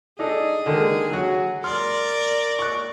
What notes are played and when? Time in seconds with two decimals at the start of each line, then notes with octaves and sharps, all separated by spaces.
0.19 D4 D#4 G#4 A4
0.66 D3 D#3 G#3
1.11 F#3 F#4
1.64 A#4 D5 C6 F6
2.59 C#6 F#6